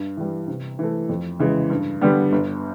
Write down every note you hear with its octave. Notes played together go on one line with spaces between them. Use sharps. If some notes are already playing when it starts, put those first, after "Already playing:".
Already playing: G2
E3 G3
C3
E3 A3
F2
C#3 E3 G#3
G2
D3 G3 B3
G1